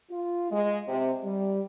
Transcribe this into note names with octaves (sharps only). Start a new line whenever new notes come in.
F4
G#3
C3
G3